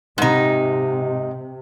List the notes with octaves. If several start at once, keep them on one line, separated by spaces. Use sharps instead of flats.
G#2 C3 D#4